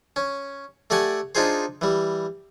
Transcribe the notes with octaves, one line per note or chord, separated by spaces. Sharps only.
C#4
A3 G4 D5 F#5 G#5
D4 D#4 F4 G#4 C5
E3 G3